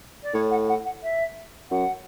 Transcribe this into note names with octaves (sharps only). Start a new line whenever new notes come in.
D5
A2 C#5
F#5
F#5
F#5
E5
F#2 F#5